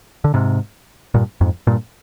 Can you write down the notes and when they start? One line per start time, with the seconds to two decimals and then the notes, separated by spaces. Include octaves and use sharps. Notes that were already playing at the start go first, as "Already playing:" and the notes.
0.24 D3
0.34 G#2 C3
1.14 G2 A#2
1.41 F2 G#2
1.67 G2 A#2